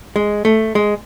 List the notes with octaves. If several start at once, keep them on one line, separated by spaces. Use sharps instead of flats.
G#3
A3
G#3